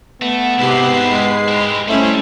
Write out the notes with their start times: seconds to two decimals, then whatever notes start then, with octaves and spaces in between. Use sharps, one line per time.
0.22 A3 B3
0.59 G#2 C3 E4 G4 B4 C7
1.05 G#3
1.48 E4 G4
1.88 G3 A3 C#4 E4 C5